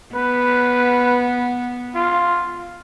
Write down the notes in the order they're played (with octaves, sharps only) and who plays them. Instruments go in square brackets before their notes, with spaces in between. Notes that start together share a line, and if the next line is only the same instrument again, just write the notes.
[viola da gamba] B3 [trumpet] B4
[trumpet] F4